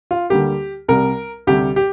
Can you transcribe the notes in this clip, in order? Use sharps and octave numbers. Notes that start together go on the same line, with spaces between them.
F4
D2 D3 G3 A#3 G4
C2 C3 G3 A#4
D2 C3 G3 G4
G4